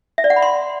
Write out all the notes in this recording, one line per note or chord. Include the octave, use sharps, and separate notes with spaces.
E5
D5
F#5
B5
C6